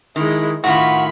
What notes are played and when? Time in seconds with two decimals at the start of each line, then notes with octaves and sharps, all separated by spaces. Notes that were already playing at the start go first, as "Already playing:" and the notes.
0.16 D#3 G#3 E4
0.64 A2 D#3 F4 F#4 E5 B5